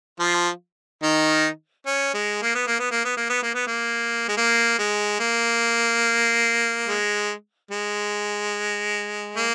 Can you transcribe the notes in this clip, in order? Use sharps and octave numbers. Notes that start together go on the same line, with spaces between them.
F3 F4
D#3 D#4
C#4
G#3
A#3
B3
A#3
B3
A#3
B3
A#3
B3
A#3
B3
A#3
G#3
A#3
G#3
A#3
G#3
G#3
A#3